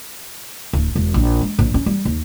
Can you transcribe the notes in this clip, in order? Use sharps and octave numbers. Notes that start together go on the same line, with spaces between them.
D1
E1
A#1
G#3
A#1
C#4
G3
D#2